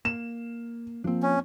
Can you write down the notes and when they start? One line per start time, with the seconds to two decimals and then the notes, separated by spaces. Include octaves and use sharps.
0.05 A#3 E7
1.04 F3 A#3 C4 D4
1.23 C#4